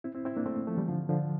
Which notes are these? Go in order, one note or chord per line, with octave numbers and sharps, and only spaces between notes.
C4 E4
C4 E4
C4 E4
A#3 D4
A3 C4
F3 A3
E3 G3
D3 F3
D3 F3